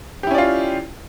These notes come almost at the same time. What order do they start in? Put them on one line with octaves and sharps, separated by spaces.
G4 E4 C#4 D5 F4